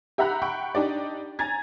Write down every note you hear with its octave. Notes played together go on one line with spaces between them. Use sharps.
G4 E5 F#5 A#5 B5 F#6
F#5 G5 B5 C#6
D4 D#4 G4 D5
G#5 A#5 G#6 A6